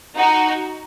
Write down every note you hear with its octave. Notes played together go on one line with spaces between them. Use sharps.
D#4 F#4